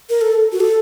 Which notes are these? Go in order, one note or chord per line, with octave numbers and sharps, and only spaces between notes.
A#4
A4
F#4
A4